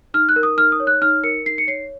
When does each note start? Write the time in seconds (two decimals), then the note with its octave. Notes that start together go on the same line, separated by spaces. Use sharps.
0.14 D#4 F6
0.29 F#6
0.36 A#4
0.43 D#6
0.57 D#4 F6
0.72 D#6
0.80 C#5
0.87 F#6
1.02 D#4 F6
1.23 A#4 C#7
1.46 D#4 C7
1.58 C#7
1.67 C#5 C7